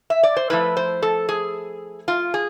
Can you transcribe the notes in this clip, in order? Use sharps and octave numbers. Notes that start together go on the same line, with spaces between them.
E5
D5
C5
F3 A3 E4 B4
C5
A4
G#4
F4
G#4